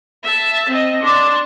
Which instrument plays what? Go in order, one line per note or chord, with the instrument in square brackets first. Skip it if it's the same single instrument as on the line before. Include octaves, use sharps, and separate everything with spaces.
[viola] E5 A5
C4 D#5
[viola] D4 A5 [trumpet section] C6 D6